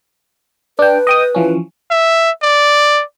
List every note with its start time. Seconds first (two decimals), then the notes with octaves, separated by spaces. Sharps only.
0.79 D4 B4 G5
1.07 D#5 G5 D#6
1.35 E3 F3 C#4
1.91 E5
2.42 D5